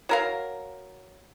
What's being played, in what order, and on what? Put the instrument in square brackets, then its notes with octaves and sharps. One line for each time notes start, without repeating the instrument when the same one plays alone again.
[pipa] F#3 A#4 F5